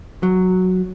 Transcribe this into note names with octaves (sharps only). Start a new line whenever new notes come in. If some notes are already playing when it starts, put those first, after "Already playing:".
F#3